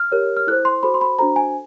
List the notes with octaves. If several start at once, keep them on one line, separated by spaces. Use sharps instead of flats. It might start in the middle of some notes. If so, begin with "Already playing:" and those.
Already playing: F6
G4 A#4 C#5
F6
E4 A4 C5 F#6
C6
F#4 A4 C5 B5
C6
B5
D4 F#4 A4 C5 A#5
G#5